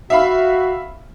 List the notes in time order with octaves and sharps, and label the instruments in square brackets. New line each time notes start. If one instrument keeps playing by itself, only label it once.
[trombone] F#4 [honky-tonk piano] E5 F5 B5